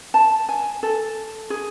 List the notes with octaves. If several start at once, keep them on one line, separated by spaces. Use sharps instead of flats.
A5
G#5
A4
G#4